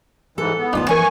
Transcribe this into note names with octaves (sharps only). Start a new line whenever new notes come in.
G#2 E3 A4
B3
D2 D4 D#4 F4 A5
E3 C#4 A#4 G#5 C#6